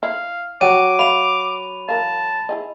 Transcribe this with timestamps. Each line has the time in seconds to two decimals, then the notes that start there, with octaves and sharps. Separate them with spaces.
0.03 E4 F5
0.61 F#3 G5 D6 D#7
0.99 E5 F5 B5 F7
1.88 E3 A#4 F5 A5
2.49 E4 G#4 D#5